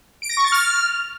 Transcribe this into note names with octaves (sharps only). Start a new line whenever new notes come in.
D7
A#6
C#6
A6
F6